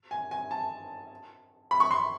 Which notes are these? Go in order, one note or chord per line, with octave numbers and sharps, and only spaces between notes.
G#5
G#5
A5
B5
C#6
C6